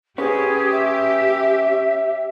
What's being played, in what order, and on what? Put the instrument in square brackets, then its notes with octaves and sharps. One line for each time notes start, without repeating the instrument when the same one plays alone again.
[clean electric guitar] C#4 B4 [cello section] G4 [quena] G#4
[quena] E5